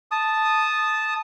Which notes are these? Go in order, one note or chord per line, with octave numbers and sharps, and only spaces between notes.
A5 D#6